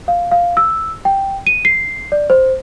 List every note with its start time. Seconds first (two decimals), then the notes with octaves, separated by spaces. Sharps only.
0.08 F5
0.31 F5
0.57 E6
1.05 G5
1.47 D#7
1.65 C7
2.12 D5
2.30 C5